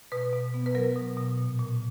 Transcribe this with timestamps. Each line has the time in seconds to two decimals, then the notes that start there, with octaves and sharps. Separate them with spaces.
0.12 B2 B4
0.33 B2
0.54 B3
0.66 B4
0.75 F#3 A#4
0.96 B2
1.17 B2
1.38 A#2
1.59 A#2